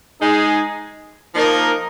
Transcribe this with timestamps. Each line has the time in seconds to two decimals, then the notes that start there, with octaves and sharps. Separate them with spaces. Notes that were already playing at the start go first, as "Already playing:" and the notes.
0.20 G#3 D#4 G#4
1.33 F3 A#3 D#4 A#4